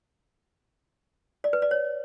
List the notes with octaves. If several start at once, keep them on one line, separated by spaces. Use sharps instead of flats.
D5
B4
D5
C#5